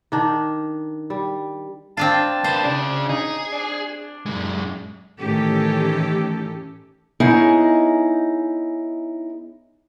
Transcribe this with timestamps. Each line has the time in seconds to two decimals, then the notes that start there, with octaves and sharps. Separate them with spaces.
0.12 D#3 D4 D#4
1.10 G3
1.97 C4 D4 F4 A5
2.44 A#3 B4 C5
2.64 C#3 D4 G#4
3.09 D#4 G#4
3.52 D4
4.26 F#2 G#3
5.19 A2 D#3 E3 C#4 G4 A4
7.20 B3 C#4 D#4 E4 G#4 D#5